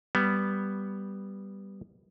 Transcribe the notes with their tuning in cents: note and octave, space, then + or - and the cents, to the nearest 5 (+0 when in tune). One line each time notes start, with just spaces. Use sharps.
G3 +0 B3 +0